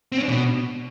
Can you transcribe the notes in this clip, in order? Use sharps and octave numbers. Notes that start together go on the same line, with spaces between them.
C4
C#4
D4
B2